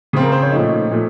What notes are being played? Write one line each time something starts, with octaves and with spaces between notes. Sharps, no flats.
C#3 F3 C4 F4
A#4
C5
C#5
A#2 F3 A3 D#4
A#2 F3 A3